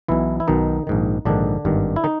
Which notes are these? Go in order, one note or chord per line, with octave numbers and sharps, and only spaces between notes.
B1 B2 E3 E4
E4
B1 B2 D#3 D#4
A#1 G#2 D#3
A#1 G#2 D3 D#3 D4
G#1 G2 D#3
E4
D#3 D#4